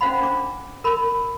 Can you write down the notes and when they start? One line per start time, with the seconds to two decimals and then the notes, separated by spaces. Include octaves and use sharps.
0.01 C#4 C5 F5 F#5 B5
0.21 D4 D6
0.84 A#4 B5